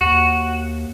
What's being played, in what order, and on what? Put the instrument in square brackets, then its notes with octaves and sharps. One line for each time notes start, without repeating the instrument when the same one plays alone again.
[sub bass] D#2 [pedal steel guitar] F#4